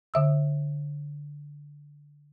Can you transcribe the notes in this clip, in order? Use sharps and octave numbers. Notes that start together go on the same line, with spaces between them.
D3 E5 E6